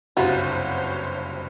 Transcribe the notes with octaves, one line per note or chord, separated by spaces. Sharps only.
F#1 C2 G2 F4 F#4 C5 C#5